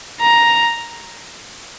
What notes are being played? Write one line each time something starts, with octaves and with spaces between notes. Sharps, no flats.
A#5